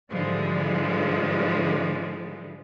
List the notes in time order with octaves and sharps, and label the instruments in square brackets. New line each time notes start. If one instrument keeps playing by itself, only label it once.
[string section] G#2 D3 E3 F3 G3 G#3